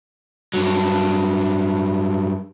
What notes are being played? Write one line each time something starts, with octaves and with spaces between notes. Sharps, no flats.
G2 F#3